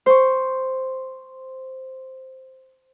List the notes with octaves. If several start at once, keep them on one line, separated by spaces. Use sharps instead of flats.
C5 C#6